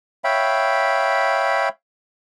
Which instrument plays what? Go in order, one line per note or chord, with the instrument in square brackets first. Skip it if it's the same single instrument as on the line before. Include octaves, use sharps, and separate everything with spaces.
[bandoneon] C#5 E5 F5 G5 B5